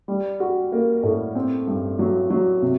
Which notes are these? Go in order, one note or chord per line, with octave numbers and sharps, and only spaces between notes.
G3
F#4
A#3
A2
C4
G2
F#3
F#3
C3